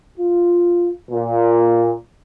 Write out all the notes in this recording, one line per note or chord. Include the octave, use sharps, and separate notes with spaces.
F4
A#2